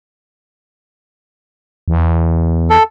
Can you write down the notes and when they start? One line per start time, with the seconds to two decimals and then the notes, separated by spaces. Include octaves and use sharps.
1.88 E2
2.70 A4